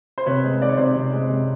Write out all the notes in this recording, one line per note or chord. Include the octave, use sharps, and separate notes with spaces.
C5
C3 B4 C#5
G#3
D#3 D5
C#5
C3 C5 D5
C3
G#3
C3